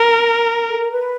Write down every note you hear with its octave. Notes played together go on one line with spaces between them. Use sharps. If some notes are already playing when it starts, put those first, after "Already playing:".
Already playing: A#4
A4
A#4
B4